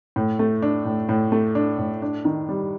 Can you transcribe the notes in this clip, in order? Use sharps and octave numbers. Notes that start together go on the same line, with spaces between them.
A2
A3
D4
A2
A2
A3
D4
A2
D4
D#3
G3